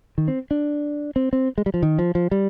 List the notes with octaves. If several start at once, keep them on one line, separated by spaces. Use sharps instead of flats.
D#3
C4
D4
C4
C4
G#3
G3
F3
D#3
F3
F3
G3